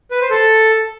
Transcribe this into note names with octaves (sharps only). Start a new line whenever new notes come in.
B4
C5
A4